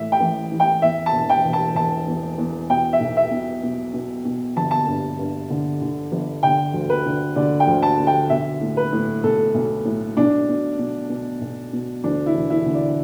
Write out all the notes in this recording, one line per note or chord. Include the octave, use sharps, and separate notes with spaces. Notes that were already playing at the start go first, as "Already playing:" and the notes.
Already playing: A2 E3 E5
G5
A1
E3
G5
E2 E5
A5
E1
G5
E1
A5
E1 A5
E2
E2
B2 G5
E5
B1
E5
B2
B2
B2
B2
G1 A5
A5
G2
G2
D3
D3
G1
D3 G5
D2
B4
D3
D3 D5
G5
D2
A5
D3
G5
B1 E5
A2
B4
A2
B1 A4
B1
A2
B1 D4
B2
B2
B2
B1
B2
D2 D4
E4
E1
E4
D3
D5